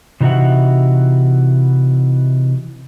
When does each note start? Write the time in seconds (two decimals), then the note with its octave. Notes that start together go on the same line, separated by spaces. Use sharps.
0.21 C3 E3 D#4 F#4 E5 F#5